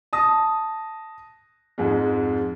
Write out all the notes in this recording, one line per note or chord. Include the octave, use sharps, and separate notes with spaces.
A5 D#6 A#6
F2 G#2 G#3